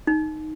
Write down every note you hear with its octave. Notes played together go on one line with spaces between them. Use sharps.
D#4